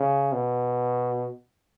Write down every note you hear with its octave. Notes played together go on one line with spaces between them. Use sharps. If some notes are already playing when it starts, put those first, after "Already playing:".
Already playing: C#3
B2